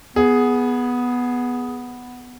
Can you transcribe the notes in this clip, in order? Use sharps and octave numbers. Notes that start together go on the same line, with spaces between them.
B3 G#4